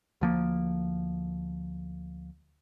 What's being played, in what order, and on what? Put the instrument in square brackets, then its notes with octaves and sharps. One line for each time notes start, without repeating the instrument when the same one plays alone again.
[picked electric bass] D2 F3 A#3